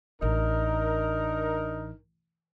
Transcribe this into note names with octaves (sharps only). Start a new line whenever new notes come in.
A1 D4 D#4 A#4